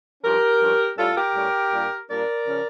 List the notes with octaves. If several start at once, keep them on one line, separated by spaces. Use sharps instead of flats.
G2 F3 C#4 G4 A#4
G2 F3 C#4
A2 G3 C#4 F4 A4
G4 A#4
A2 G3 C#4
A#2 G3 A#3 D4
A#2 G3 A#3 D4 A#4 D5
C#3 F3 C#4